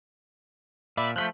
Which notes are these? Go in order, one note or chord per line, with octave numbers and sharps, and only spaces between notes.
A#2 D5 E5 B5
F3 G#3 A3 F#6 G6 B6